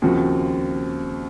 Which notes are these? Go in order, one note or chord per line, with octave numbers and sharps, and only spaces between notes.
D#2 C#3 F3 C4 F#4